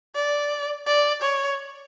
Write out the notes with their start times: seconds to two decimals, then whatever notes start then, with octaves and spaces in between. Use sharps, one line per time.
0.15 D5
0.87 D5
1.22 C#5